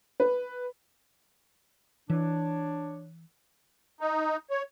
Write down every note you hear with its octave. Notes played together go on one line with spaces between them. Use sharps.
B4
E3 D4 C#5
D#4
C#5